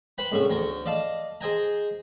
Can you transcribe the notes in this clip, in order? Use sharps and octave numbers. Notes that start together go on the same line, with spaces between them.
B4 C5 G5 B5
C2 A2 C#3 C#6
D2 G5 A#5 C#6
D5 D#5 F5 A5
G#4 C5 D#5 G5 G#5 A#5